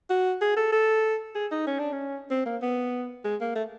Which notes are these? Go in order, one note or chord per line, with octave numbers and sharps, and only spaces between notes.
F#4
G#4
A4
A4
G#4
D#4
C#4
D4
C#4
C4
A#3
B3
G#3
A#3
A3